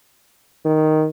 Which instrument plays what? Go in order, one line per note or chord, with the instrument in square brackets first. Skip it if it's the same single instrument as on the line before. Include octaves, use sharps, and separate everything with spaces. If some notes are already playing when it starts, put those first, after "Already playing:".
[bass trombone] D#3